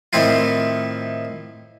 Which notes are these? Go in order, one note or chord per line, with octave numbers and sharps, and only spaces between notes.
A2 D#3 C4 E4 F4